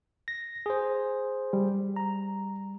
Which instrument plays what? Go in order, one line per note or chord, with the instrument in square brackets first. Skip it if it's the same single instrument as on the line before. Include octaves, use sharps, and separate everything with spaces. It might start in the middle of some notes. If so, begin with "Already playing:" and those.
[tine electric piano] A#6
G#4 C5
[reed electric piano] G3
[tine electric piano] A#5